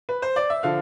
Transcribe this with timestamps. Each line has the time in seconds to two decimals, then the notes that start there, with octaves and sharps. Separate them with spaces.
0.09 B4
0.22 C5
0.36 D5
0.50 E5
0.63 D3 F3 F5